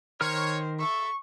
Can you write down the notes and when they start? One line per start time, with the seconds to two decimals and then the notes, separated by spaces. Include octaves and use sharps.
0.21 D#3 A#4 C5 C#5 F6
0.79 A4 E5 C#6